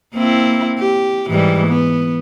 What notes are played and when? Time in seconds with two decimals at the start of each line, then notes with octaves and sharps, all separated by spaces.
0.14 A#3 C4 E4
0.79 G4
1.30 G#2 E3 G3
1.67 B3